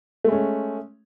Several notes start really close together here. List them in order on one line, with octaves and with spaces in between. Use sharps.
A3 G#3 C#4